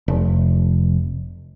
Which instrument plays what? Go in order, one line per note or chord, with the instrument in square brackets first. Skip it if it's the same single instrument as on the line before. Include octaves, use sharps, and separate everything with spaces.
[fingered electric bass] F1